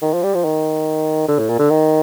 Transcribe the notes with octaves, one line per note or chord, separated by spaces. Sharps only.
D#3
F3
G3
F3
D#3
D3
A2
A#2
D3
D#3